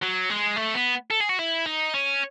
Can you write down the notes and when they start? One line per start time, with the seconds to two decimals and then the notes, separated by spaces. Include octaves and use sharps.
0.02 F#3
0.30 G#3
0.56 A3
0.75 B3
1.11 A4
1.21 G#4
1.29 F#4
1.39 E4
1.66 D#4
1.94 C#4